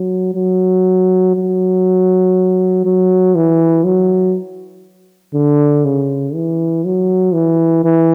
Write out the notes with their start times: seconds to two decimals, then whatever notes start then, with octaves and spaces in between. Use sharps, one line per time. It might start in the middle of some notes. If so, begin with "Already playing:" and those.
Already playing: F#3
0.35 F#3
1.35 F#3
2.85 F#3
3.35 E3
3.84 F#3
5.34 D3
5.85 C#3
6.34 E3
6.85 F#3
7.34 E3
7.85 E3